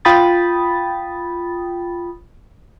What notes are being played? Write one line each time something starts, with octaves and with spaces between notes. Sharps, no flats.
F4 G5 B5 D#6 A6